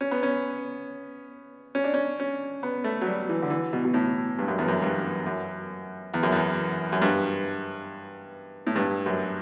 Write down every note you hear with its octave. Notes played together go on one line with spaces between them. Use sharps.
C#4
B3
C#4
C#4
D4
C#4
C#4
B3
A3
F#3
G3
E3
D3
E3
B2
B2
A2
G2
F#2
E2
F#2
G2
F#2
E2
F#2
E2
F#2
G2
A2
G2
F#2